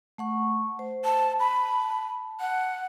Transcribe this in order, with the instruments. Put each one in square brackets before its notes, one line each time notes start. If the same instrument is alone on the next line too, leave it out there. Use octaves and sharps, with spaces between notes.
[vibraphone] A3 F#5 C#6
C5
[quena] A5
B5
[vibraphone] A5
[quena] F#5